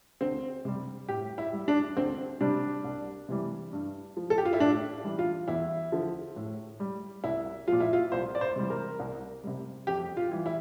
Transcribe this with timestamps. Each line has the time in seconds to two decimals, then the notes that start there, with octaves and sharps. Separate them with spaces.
0.21 D2 C4
0.65 C3 G3
1.09 A2 G4
1.38 E4
1.53 G3
1.68 D4
1.97 D2 C4
2.41 C3 G3 D4
2.84 C2
3.29 C3 E3 G3
3.73 G2
4.17 F3
4.30 A4
4.38 G4
4.45 F4
4.53 E4
4.60 A2 D4
5.04 E3 G3
5.19 F4
5.48 E2 E4
5.92 D3 F3
6.36 A2
6.80 G3
7.24 C2 E4
7.68 A#2 F3 F4
7.80 E4
7.93 F4
8.12 C2 C5
8.35 D5
8.41 C5
8.56 C3 E3 G3
8.70 A#4
8.99 C2
9.44 C3 G3
9.87 F2 G4
10.17 F4
10.32 E3 G3
10.46 E4